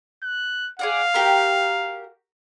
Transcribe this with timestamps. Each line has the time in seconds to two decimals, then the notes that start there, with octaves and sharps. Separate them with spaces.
0.23 F#6
0.79 G#4 D5 F5 F#5
1.14 F#4 G4 A#4